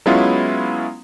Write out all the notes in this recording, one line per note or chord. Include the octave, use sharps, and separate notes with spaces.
F#3 G#3 B3 C#4 E4 F4